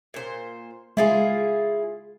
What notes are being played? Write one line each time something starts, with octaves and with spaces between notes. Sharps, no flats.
A#2 C5
G#3 E4 F4 G#4